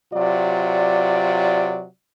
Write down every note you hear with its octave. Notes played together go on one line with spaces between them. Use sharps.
C3 F#3 F4 D5